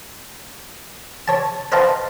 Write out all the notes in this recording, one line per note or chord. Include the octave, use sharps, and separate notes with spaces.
C#5 A5
B4 C5 D#5 F5 A5 A#5